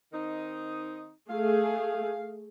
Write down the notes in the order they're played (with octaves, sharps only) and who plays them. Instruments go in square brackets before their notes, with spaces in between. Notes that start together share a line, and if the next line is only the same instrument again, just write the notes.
[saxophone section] D#3 C4 D#4
[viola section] A3 G#4 [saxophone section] F5